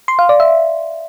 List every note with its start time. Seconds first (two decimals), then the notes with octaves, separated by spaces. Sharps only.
0.08 C6
0.19 F5
0.29 D5
0.40 E5